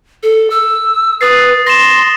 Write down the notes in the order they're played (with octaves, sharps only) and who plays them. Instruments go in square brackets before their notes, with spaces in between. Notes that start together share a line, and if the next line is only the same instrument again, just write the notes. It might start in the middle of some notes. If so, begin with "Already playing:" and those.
[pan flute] A4
E6
[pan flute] B4 [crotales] D#6 A6 C7
[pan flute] C6 [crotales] A#6 E7